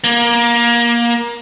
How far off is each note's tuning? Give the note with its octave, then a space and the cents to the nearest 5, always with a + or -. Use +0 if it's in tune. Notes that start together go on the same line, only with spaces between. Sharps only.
A#3 +20